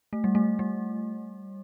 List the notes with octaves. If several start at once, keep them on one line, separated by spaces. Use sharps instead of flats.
A3
G3
A3
G3